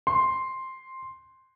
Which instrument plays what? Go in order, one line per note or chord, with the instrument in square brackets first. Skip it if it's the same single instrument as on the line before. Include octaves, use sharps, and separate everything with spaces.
[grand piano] C6